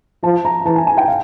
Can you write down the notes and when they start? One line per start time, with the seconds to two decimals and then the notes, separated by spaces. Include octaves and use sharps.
0.23 F3 A5
0.45 A#5
0.66 E3 A5
0.76 G#5
0.87 G#5
0.97 G5
1.08 F5